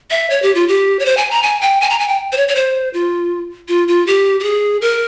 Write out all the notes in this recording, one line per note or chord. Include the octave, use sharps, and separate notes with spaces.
E5
C#5
G4
F4
G4
C#5
C5
G#5
A#5
G#5
G5
G#5
A#5
G#5
G5
C5
C#5
C#5
C5
F4
F4
F4
G4
G4
G#4
A#4